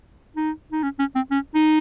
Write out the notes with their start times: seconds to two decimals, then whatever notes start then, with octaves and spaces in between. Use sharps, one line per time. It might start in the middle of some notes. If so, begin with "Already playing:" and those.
0.36 D#4
0.72 D#4
0.83 C#4
0.99 C#4
1.16 C4
1.31 C#4
1.55 D#4